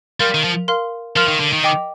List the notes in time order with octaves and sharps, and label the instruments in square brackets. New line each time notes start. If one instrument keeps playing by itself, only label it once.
[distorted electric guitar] G3 [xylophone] A#4 F5 C6 F6
[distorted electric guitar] D#3
F3
[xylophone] A#4 F5 C6 F6
[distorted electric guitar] F3 [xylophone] A#4 F5 C6 F6
[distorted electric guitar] D#3
D3
D#3
[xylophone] D#5 G5 D6